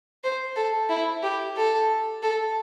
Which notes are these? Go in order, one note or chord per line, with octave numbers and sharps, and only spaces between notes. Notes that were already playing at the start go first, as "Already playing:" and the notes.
C5
A4
E4
G4
A4
A4